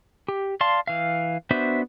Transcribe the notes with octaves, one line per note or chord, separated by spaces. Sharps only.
G4
D5 F5 A5 C6
E3 F5
B3 D4 F#4 C5 E5